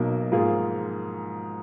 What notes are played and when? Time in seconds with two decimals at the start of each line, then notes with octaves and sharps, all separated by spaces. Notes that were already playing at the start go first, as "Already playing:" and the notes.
Already playing: B1 B2 F#3 A#3 D#4
0.31 G#2 F3 A#3 F4 G#4